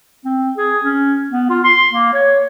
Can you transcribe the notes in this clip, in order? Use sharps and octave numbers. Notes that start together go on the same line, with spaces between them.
C4
G#4
C#4
B3
F4
C6
A#3
C#5